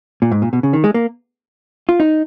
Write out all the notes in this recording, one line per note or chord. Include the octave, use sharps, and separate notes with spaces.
A#2
G#2
A#2
B2
C#3
D#3
G#3
A#3
F4
D#4